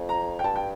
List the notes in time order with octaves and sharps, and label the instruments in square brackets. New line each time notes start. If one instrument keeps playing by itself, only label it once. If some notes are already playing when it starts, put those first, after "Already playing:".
Already playing: [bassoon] F2
[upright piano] A#5
G5
[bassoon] G2 [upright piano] A5
[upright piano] G5